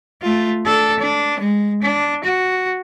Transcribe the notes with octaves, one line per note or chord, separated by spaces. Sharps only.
A3 F4
D4 A4
D4
G#3
D4
F#4